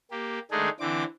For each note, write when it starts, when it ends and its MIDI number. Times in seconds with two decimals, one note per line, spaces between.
0.11 0.39 58
0.11 0.39 67
0.51 0.69 51
0.51 0.69 56
0.51 0.69 57
0.51 0.69 62
0.51 0.69 63
0.51 0.69 68
0.80 1.04 50
0.80 1.04 52
0.80 1.04 60
0.80 1.04 86